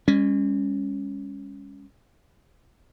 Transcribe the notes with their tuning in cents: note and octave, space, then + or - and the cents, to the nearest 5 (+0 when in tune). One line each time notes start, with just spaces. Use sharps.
G#3 -45 C#4 +0